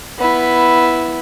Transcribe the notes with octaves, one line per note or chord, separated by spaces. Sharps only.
B3 E4